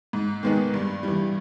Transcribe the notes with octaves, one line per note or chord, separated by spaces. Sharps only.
G#2
D#3 G#3 B3 D#4
G2
E3 G3